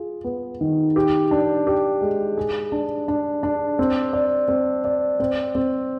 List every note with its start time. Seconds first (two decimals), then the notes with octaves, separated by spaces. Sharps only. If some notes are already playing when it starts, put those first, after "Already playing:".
Already playing: F4 G#4
0.24 B3
0.61 D#3
0.96 G4
1.31 D4
1.67 G4
2.01 G#3
2.37 G#4
2.72 D4
3.08 D4
3.43 D4
3.79 C4
4.13 D5
4.48 C4
4.85 D5
5.20 C4
5.55 C4